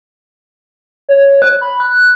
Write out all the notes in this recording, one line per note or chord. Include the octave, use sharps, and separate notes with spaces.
C#5
F#6
B5
F#6